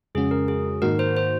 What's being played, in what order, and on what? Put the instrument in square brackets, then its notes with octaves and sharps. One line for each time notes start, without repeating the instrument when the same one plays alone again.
[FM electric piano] F2 C#3 G#3 C#4 F#4 [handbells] G#4
[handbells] A#4
G#4
[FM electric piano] G#2 D#3 A#3 D#4 F#4 [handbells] A#4
[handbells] C5
C5